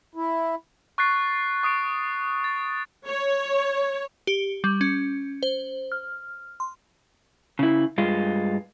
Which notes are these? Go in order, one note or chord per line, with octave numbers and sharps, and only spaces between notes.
E4
C#6 F#6 A6 C7
C#6 D#6 C7 D7
A6
C#5
G4
G3
C#4
C5
F6
C6
C#3 E4
G2 G#3 F4